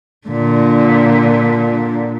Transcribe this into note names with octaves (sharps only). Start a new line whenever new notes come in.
A#2 D3